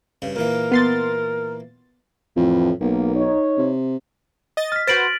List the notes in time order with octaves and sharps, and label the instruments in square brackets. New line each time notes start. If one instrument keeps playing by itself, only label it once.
[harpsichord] G2 C#3
[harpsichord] A#2 E3 A#3 [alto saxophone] A#4
[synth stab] B3 C6 A6
[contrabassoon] F2 [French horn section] A2 E3
[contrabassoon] B1 [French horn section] A#3
[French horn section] D#4 C#5
[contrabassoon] C3
[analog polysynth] D#5 A6
[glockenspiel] F6 B6
[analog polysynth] F#4 B4 C5 [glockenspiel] A6 D7 F#7